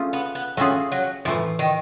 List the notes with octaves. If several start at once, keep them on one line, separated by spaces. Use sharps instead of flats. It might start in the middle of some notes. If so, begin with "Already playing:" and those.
Already playing: A3 C#4 F4 G#4
B3
B3
F#3 A3 C#4 F4 G#4
F#3
A2 E3 F3 A3
D#3